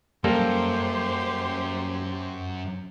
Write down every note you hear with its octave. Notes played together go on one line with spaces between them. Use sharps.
F#2 G3 A#3 G4 A4 A#4 C5